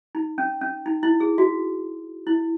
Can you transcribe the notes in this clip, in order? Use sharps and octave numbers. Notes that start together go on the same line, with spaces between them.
D#4
C#4
C#4
D#4
E4
G#4
F#4
E4